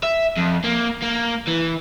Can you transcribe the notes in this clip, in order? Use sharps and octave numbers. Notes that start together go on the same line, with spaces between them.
E5
F2
A#3
A#3
E3